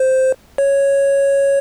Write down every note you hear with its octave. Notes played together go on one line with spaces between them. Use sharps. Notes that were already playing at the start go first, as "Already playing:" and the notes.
Already playing: C5
C#5